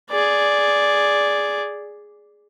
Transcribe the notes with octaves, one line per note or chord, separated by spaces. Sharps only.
G#4 D5